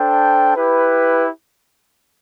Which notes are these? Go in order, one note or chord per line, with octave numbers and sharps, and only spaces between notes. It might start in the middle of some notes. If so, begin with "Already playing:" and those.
Already playing: D4 A4 C5 G5
E4 G4 B4